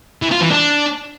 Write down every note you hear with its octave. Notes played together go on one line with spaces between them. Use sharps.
E3
F4
E3
D4